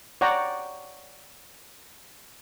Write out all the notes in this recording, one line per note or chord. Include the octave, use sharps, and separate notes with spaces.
C#5 D5 F#5 G5 A#5